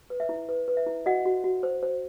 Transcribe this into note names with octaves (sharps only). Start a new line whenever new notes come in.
B4
E5
E4
B4
B4
E5
E4
F#4 D#5 F#5
F#4
F#4
C5
C5